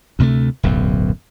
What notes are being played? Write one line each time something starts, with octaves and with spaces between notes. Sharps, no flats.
D2 C3 G#3 A3
D1 B1 F#2